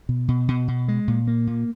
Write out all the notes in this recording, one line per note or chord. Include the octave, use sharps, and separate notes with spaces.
B2
B2
B2
B2
G#3
A#2
A#3
A#2